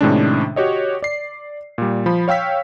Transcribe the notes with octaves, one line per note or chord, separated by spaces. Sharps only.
A2 C3 D#3 G#3 C#4 D4
F#4 G4 C#5 D#5
D5 C7
A#2 G3
F3 B5
C#5 F5 G5 E6 B6